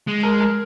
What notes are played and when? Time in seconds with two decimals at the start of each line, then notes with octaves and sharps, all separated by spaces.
0.08 G#3
0.23 A#4
0.41 A#4